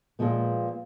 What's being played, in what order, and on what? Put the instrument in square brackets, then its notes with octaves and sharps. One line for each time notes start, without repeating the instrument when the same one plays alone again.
[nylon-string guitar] A#2 F3 G#3 B3